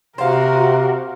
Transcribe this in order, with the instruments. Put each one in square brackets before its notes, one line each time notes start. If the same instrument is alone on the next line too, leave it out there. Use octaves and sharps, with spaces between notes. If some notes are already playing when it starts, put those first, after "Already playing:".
[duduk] C3 [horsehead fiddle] F#4 A#4 [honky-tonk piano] C5 F5